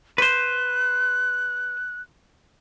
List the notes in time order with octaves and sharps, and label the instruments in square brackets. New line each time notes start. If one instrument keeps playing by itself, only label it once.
[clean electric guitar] B4 C5 [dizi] F#6